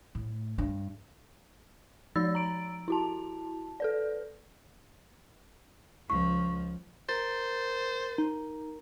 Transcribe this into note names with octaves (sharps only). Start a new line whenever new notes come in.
A2
G2
F3 D#4 D5 E6 A6
A#5 D7
E4 F#4 A5
A4 B4 D5
C#2 F3 C#6
A#4 C5 A6
D#4